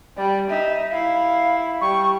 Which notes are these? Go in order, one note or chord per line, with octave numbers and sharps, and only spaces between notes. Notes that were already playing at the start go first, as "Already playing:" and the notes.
G3 D5
D#4 E5
E4 F5
G3 C#6